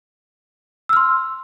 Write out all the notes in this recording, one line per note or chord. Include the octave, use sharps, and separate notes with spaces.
C6 E6 F6